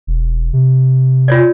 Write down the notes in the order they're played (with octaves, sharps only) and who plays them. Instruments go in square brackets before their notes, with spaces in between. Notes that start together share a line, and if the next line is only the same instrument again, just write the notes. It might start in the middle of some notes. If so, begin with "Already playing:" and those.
[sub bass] E1
C3
[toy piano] F4 C#5 D5